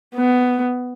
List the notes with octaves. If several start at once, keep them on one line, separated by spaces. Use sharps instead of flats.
B3